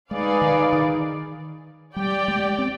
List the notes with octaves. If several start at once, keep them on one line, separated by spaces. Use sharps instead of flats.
G#3 D#4 G#4 B4 D5 F5
D#3
D#3
G3 G4 D5 G5
G#3
C4